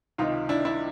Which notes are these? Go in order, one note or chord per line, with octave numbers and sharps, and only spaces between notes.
C#2 C3 D#3 D#4 F4
D4 E4
D4 E4